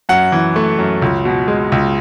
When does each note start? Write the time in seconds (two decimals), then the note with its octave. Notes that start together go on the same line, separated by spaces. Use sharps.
0.09 F#2 F#5
0.32 E3
0.56 A3
0.79 F#2
1.02 C#2
1.25 B2
1.48 G#3
1.72 C#2